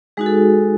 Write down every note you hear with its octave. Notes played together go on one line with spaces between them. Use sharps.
G#3 D#4 F#4 G#4
A4